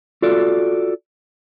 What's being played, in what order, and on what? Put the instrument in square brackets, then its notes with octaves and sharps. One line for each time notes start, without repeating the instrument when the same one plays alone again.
[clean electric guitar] F4 F#4 A4 D5